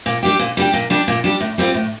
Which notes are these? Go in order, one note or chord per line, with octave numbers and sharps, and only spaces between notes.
A#2
G3 D4 G4
A#2
G3 D4 G4
A#2
G3 D4 G4
A#2
G3 D4 G4
A2
G3 C4 F4
A2